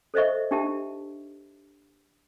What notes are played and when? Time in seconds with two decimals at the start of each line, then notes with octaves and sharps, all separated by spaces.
0.14 A4 C5 D#5 E5 C#6
0.51 D4 D#4 G4 E5 A5